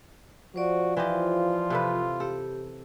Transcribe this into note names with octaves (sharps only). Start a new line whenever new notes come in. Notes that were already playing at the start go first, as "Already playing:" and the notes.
F3 F#4 C5 D5
E3 F4 G4 D#5
C3 A4 B4
G4 A4